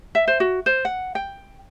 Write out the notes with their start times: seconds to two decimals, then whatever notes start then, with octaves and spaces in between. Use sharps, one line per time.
0.15 E5
0.28 C5
0.40 F#4
0.66 C5
0.85 F#5
1.15 G5